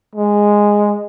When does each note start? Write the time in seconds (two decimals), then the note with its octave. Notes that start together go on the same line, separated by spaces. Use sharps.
0.15 G#3